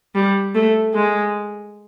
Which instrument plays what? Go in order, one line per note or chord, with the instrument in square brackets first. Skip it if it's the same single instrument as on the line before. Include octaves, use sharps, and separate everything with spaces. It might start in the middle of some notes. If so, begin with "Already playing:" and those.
[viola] G3
A3
G#3